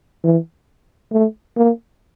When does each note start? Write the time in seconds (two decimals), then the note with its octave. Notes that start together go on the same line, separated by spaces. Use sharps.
0.24 E3
1.12 A3
1.57 A#3